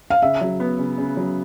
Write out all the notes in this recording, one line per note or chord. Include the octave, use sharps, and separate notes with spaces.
F5
C#3 E5
F#3
B3
C#3
C#3
F#3